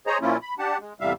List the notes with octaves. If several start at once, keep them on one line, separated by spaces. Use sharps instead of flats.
G#4 C5 C#5 D#5 A#5
A#2 F3 A#3 C#4 E4 F4
B5
D4 G4 F#5 A5
G#3
E2 A2 C3 G3 E5 F5